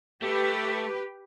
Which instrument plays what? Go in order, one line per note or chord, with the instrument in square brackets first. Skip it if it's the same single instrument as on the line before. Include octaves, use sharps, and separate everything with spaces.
[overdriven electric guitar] A3 [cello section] G4 B4